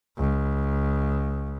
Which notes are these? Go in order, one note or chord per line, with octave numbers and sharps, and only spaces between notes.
C#2